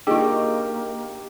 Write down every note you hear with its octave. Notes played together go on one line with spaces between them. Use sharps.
A#3 D4 D#4 F4 G4 G#4 D#5